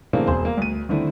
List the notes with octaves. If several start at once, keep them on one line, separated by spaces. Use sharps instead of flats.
C#3 E3 A3 A#3 C4 D4
E1 G#4 C5
A#3
D2 D#7
D3 D#3 A3 C4 D4 E4